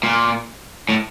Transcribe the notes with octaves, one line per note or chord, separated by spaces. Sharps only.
A#2
A2